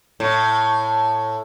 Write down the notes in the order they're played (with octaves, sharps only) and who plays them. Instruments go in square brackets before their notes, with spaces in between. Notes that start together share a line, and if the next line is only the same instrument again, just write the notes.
[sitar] A2